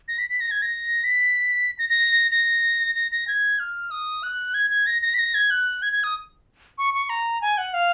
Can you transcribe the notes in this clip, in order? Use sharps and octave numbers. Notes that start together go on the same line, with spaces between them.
A#6
B6
B6
A#6
G#6
A#6
B6
A#6
A#6
A#6
A#6
A#6
G#6
F6
D#6
F#6
G#6
G#6
A#6
A#6
B6
A#6
G#6
F#6
G#6
G#6
D#6
C#6
C#6
A#5
G#5
F#5
F5